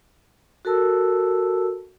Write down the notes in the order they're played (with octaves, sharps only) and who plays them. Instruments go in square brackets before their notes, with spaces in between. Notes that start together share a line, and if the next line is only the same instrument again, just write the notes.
[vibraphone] F#4 A4 A#4 A5 E6